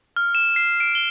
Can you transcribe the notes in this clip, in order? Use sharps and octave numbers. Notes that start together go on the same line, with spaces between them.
F6
E7
C7
D7
G7